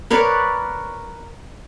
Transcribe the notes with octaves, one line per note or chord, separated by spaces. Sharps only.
A#4 B4 C#5 D5